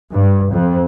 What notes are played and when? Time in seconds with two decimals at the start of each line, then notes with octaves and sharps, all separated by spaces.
0.13 G2
0.53 F2